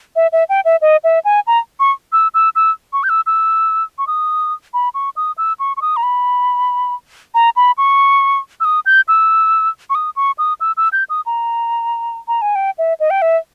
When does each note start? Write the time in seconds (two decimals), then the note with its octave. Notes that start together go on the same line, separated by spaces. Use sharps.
0.16 E5
0.32 E5
0.49 G5
0.65 E5
0.81 D#5
1.04 E5
1.25 G#5
1.47 A#5
1.80 C#6
2.13 E6
2.34 E6
2.56 E6
2.93 C#6
3.04 G6
3.09 E6
3.26 E6
3.98 C#6
4.07 D#6
4.74 B5
4.94 C#6
5.16 D#6
5.38 E6
5.60 C#6
5.77 C#6
5.82 D#6
5.97 A#5
6.03 B5
7.35 A#5
7.56 B5
7.78 C#6
8.60 E6
8.65 D#6
8.86 G6
9.08 E6
9.90 C#6
9.95 D#6
10.16 C#6
10.38 D#6
10.61 E6
10.77 E6
10.93 G6
11.10 D#6
11.26 A#5
12.28 A#5
12.42 G#5
12.55 G5
12.78 E5
13.00 D#5
13.10 G5
13.22 E5